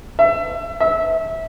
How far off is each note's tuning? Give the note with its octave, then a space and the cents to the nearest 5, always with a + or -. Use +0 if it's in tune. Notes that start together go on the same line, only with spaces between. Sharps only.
E5 +25
E5 -20